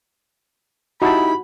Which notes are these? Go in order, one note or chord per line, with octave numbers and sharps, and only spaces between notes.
D#4 E4 F#4 G4 A5 B5